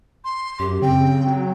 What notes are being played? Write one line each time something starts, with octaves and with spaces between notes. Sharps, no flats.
C6
F#2 G4
C#3 C4 G5
F#3